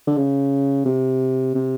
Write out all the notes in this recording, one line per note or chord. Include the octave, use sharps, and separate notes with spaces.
D3
C#3
C3
C3